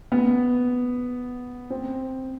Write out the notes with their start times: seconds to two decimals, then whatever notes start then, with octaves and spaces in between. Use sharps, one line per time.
0.12 B3
1.70 C4